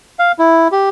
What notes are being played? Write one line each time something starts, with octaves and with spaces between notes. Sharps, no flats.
F5
E4
G4